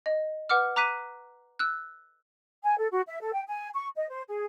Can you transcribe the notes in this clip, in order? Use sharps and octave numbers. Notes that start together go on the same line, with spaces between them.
D#5
B4 F#5 D6 F6
A#5 D6 F#6 B6 D#7
E6 F#6
G#5
A4
F#4
E5
A4
G5
G#5
C#6
D#5
C5
G#4